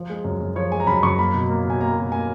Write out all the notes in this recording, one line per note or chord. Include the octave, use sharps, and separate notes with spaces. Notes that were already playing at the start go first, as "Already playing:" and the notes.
Already playing: F3
G#3
F#2
F#2
F3 C#5
G#3 G#5
A#5
F#2 B5
F#2 C#6
A#3 B5
B2
A#3
B2
G#5
A#3 A#5
B2
A#3 G#5